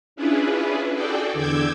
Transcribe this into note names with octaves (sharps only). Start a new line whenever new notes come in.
C#4 D4 E4 F4 G#4 B4
F#4 G#4 A4 D5 G5
E2 D3 D6 E6 G6 G#6